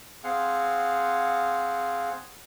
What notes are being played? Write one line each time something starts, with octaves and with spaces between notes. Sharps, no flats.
C4 G#4 F5 F#5